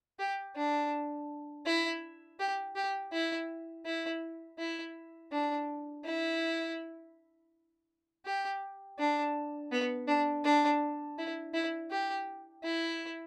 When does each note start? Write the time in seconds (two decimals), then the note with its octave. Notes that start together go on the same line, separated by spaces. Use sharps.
0.19 G4
0.56 D4
1.66 E4
2.39 G4
2.76 G4
3.12 E4
3.86 E4
4.58 E4
5.32 D4
6.05 E4
8.25 G4
8.99 D4
9.72 B3
10.08 D4
10.45 D4
11.18 E4
11.54 E4
11.91 G4
12.64 E4